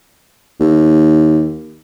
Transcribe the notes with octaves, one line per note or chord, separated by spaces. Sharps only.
D#2